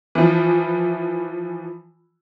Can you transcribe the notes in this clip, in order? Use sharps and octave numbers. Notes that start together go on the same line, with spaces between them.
E3 F3